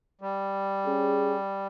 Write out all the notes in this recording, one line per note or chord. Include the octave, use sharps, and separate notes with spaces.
G3
C#4 G#4